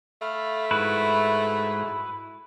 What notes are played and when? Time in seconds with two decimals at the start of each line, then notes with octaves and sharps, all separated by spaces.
0.22 A3 F5 B5
0.71 G#2 E4 F#4 B4